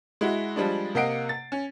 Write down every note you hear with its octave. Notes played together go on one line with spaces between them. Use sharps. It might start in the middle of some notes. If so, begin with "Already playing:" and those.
G#3 E4 F#4
F3 G3 G#3 D4
C3 A#3 D#5 F#5 C7 D7
A6
C#4